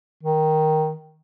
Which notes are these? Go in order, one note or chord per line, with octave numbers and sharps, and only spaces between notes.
D#3